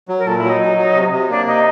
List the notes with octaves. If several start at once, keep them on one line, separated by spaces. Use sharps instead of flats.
F#3
A#4
A#2 A4
E4
F#3
D#4
F#3
F#3
C3
C3
A#3 D4
C3 D#4